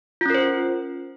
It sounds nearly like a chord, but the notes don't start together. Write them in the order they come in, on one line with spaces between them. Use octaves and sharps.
F4 C#4 A#4 C5